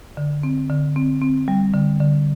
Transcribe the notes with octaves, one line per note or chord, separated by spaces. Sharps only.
D3
C4
D3
C4
C4
G3
D3
D3